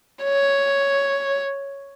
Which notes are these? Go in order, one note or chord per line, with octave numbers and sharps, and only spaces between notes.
C#5